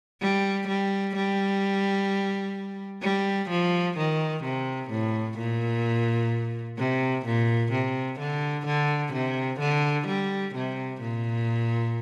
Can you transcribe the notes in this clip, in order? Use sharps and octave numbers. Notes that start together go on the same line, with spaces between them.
G3
G3
G3
G3
F3
D#3
C3
A2
A#2
C3
A#2
C3
D3
D3
C3
D3
G3
C3
A#2